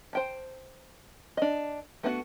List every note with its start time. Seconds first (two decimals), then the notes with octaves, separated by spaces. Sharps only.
0.13 C5 G5 A5
1.37 D4 D#5
2.03 A3 B3 D4 F#4 F#5